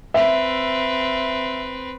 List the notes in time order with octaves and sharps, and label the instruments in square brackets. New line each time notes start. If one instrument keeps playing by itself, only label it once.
[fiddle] C4 B4 [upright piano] E5